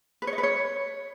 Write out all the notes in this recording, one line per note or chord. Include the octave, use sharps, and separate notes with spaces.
B4
C#5
D#5
B4
C#5